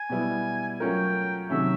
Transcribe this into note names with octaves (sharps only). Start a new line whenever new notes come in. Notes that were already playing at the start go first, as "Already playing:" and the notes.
Already playing: G#5
B2 G3 B3 E4
F#3 A3 C#4 F4 A#4 G5
C3 D#3 F#3 A3 C#4 E5